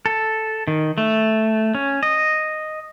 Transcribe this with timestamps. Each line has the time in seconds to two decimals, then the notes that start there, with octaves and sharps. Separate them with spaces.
0.06 A4
0.68 D#3
0.98 A3
1.75 C#4
2.03 D#5